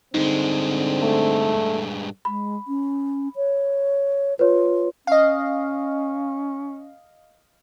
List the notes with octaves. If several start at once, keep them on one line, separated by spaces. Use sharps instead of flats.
G2 D3 G#3 C4 D#4
A3
G#3 B5
C#4
C#5
F4 B4 C#5
C#4 D#5 F5